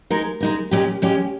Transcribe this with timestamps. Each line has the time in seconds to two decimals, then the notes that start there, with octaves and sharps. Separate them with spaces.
0.10 G#3 D#4 A#4
0.41 G#3 D#4 A#4
0.71 A#2 G#3 C#4 G4
1.02 A#2 G#3 C#4 G4